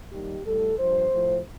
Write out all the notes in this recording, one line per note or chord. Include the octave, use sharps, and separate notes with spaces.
D#2 D#3 G3 G4
A2 G3 A4
G2 F3 C5
A2 F3